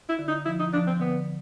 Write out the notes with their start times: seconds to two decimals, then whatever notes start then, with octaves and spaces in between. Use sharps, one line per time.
0.09 E4
0.19 D3
0.28 D#4
0.46 F3 E4
0.59 D#4
0.73 F3 D4
0.87 C4
1.00 D3 B3